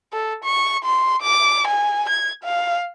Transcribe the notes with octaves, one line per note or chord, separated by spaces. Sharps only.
A4
C#6
C6
D6
G#5
G#6
F5